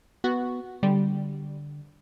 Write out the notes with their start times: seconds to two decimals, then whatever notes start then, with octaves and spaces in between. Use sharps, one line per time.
0.24 B3 F#4
0.83 D3 G3